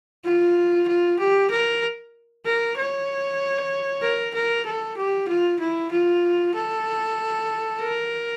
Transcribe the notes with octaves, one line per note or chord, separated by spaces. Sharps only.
F4
F4
G4
A#4
A#4
C#5
A#4
A#4
A4
G4
F4
E4
F4
A4
A#4